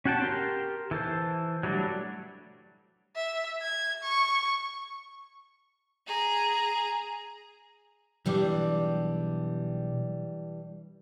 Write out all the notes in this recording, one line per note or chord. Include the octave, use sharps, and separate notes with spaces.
C#4 F#4 F#5 G5 A5
G4 A#4 C6
E3 A4 C5
F#3 G3 A3 D4
E5
G#6
C#6
G#4 A#5
B1 E3 G3 G#3 D4 G4